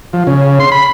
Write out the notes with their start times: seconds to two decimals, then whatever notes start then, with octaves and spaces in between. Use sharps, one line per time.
0.13 F3
0.27 C#3
0.60 C6
0.72 B5